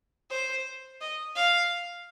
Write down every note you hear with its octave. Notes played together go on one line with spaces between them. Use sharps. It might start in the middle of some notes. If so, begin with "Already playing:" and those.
C5
D#5
F5